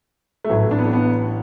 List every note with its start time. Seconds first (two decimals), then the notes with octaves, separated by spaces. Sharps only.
0.45 A3
0.49 A1 A2 E3 F#3
0.71 D4
0.78 B3
0.86 D4
0.93 B3